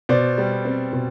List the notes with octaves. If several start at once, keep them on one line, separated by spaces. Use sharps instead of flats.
B2 C5 D5
G3
C4
B2